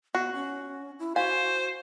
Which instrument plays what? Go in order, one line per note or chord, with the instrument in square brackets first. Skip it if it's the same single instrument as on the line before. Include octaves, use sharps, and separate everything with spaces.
[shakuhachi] B3 [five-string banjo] F#4 [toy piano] F#5
[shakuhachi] C#4
E4
[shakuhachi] F#4 [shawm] C5 [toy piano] F5 [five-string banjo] G#5